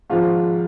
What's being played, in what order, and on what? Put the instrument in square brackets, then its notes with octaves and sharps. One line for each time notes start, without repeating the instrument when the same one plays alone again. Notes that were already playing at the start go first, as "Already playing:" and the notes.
[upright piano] G#1 G#2 F3 G#3 F4 F5